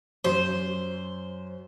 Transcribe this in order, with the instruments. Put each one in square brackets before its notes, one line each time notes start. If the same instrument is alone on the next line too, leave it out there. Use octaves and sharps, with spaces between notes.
[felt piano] F#2 [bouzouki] C5